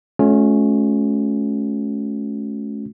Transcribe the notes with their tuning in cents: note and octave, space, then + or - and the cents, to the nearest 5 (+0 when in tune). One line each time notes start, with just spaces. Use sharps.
A3 -40 C#4 +0 F4 +45